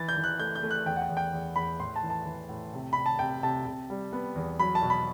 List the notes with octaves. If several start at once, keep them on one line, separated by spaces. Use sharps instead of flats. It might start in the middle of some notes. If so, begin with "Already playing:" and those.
Already playing: E3 A6
G6
E3
F#6
A3 G6
G6
A3
F#6
E2 G5
F#5
G5
E2
G5
E2
E2 B5
A2 C6
A5
E3
A5
E3
A2
C3
C3 B5
A5
C3 G5
C3 A5
C3
G3
B3
E2
F#3 B5
A5
B2
B5